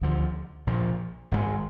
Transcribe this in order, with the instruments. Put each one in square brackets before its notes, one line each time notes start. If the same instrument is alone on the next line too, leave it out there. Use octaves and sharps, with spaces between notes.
[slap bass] D2 D3 F3
A#1 A#2 F3
G#1 G#2 D#3 G#3